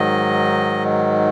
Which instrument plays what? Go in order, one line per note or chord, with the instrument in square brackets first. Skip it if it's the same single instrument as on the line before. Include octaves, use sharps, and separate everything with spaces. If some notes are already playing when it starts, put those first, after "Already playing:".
Already playing: [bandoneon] G#2 D#3 F#3 D#5